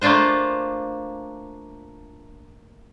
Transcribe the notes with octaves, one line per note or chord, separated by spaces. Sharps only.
A3 A#3 D4 F4 C5